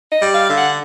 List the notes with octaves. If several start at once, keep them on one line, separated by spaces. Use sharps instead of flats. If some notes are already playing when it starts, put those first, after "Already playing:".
D#5
G3
F5
D3
F#5